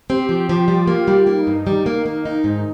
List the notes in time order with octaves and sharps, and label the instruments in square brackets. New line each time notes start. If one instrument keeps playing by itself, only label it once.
[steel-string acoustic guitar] C4 [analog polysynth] G4
[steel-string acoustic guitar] F3
[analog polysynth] G4
[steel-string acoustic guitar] F3
[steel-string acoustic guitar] G3 [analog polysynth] F4
[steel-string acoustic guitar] A#3
G3
[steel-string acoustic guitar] A#3 [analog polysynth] D#4
[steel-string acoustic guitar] G2
[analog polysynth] D#3 [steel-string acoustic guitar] G3
[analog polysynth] D#3 [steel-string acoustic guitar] A#3
[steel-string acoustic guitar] A#3
D#4
G#2